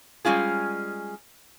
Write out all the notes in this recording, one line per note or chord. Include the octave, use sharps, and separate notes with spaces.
G3 G#3 C#4 F4 G#4